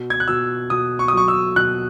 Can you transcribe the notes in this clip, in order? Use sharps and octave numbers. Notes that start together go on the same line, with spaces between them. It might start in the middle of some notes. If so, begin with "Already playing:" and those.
Already playing: B2
G#6
F#6
B2 E6
B2 D#6
C#6
D#6
F#3 C#6
E6
B2 F#6